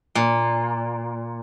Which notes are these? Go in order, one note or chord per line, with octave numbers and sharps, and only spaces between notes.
A#2